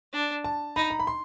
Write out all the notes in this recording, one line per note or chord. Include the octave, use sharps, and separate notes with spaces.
D4
A5
D#4 B5
A#5
B5
C6